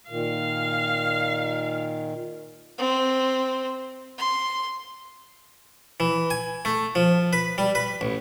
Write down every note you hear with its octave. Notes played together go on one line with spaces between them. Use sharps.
A#2 D#3 F5
C4
C6
E3
G#5
A3
F3
B4
G3
B4
A1